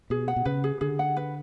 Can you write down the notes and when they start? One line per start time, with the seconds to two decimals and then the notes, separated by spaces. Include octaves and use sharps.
0.10 B2 G#4
0.28 F#5
0.36 B2
0.45 C#3 B4
0.64 G#4
0.81 D3 G#4
0.99 F#5
1.17 B4